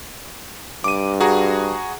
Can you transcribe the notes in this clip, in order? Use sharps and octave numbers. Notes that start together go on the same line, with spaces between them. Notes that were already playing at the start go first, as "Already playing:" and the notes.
G2 D6 D#7
F#4 G#4 A#5